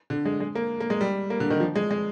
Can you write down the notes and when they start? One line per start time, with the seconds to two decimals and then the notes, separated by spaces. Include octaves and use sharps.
0.10 D3
0.26 G#3
0.40 G#3
0.55 A#3
0.80 A#3
0.90 G#3
1.01 G3
1.30 A#3
1.40 D3
1.50 D#3
1.60 F3
1.76 G#3
1.91 G#3